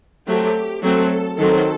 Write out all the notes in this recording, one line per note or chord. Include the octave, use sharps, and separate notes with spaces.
F#3 A3 C4 G4
F#3 A3 C4 A4
D#3 F#3 C4 A4